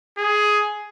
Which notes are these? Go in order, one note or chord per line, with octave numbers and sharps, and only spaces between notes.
G#4